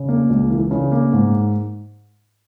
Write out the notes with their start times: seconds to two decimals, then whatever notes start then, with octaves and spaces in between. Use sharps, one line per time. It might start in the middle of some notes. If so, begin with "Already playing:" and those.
Already playing: C#3
0.09 A#3
0.30 C#2
0.50 E3
0.71 C#3
0.92 A#3
1.13 G#2